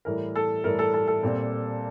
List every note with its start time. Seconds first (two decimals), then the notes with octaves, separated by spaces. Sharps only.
0.05 A2 E3 G3 A#4
0.36 A4
0.64 A2 E3 G3 A#4
0.79 A4
0.94 A4
1.08 A4
1.23 A#2 G3 C4